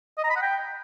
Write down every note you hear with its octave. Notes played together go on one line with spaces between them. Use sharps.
D#5
A#5
B5
F#5
G5